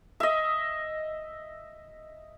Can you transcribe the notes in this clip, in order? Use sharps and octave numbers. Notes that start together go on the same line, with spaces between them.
D#5 E5